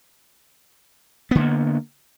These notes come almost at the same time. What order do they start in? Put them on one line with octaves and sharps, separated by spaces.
B3 D3 A#3